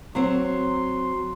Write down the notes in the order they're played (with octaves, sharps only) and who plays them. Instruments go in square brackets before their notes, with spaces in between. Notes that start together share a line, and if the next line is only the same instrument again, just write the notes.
[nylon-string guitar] F#3 C4 C5 [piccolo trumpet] C6